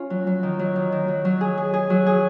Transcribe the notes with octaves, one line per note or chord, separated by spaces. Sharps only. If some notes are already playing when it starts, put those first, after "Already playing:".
Already playing: C#4 F4
F#3
F#3
D#3
F#3
D#3
D#3
F#3
F#3
G#4
G#4
G#4
F#3
G#4